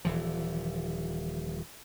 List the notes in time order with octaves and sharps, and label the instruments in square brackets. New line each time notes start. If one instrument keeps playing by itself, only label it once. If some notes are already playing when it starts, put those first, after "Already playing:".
[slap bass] D#1 E3 F3